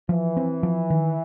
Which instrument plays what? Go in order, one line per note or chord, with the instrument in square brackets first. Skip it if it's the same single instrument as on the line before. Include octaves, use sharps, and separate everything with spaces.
[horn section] E3 [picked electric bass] F3
[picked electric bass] C4
F3
D#3